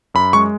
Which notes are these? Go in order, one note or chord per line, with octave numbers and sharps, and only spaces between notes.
F#2 B5
G#3 C#6